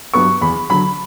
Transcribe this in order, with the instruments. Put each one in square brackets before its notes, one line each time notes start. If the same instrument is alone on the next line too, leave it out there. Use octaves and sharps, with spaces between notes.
[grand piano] G2 F#3 B3 C#6
E2 B5
D3 F#3 B5